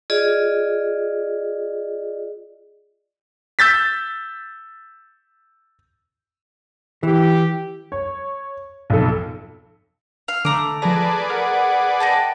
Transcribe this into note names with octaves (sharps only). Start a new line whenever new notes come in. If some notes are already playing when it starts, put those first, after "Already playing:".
F4 G#4 D5 D#5
E6 G6 A6 B6
E3 G4
C#5
B1 F2 A4
F5
D3 A3 A#5 D6
F3 G#4 B4 D5 A5 A#6
A#4 F#5
D#5 G5 A5